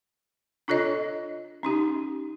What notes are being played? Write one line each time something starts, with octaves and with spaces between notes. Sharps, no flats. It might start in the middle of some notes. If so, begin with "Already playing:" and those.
D4 F4 A4 C#5 D#5
C#4 D#4 G4